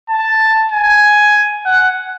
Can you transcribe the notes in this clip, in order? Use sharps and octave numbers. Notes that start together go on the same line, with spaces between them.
A5
G#5
F#5